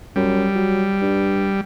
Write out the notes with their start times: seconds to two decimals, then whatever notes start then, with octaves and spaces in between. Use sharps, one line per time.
0.16 F#2 G3
0.55 F#3
1.01 G2